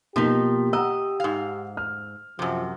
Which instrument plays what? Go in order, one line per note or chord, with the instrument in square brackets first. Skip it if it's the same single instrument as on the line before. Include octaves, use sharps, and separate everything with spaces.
[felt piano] B2 A#3 B6 [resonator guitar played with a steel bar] F3 D#4 [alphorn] G4
[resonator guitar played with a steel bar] D#5 [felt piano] F#5 A#5 E6
[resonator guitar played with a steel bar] G#2 F5
[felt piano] F6
[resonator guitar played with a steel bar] F#2 C3 [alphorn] F3